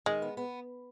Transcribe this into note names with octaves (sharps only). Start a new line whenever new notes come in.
D#3 G#3
B3
B3